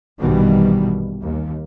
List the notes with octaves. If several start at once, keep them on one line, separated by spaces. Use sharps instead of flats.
A#1 G2 B2 D#3 E3 G3
D#2